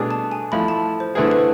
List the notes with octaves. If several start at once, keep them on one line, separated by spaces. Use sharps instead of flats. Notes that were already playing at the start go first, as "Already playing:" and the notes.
Already playing: B2 A3 D4 G#4
A5
G#5
F3 A3 E4 B5
A5
C5
D3 A3 E4 G#4 B4
B4